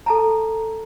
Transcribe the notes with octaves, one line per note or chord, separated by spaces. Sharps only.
A4 A5 A#5